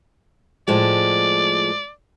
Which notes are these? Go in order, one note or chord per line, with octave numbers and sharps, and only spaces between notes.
A2 F3 G#3 D5